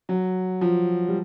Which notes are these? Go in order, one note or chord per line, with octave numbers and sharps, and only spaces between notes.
F#3
F3
G3